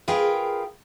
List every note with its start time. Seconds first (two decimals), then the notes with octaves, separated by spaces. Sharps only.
0.08 F4 G#4 A#4 B4 F5 G5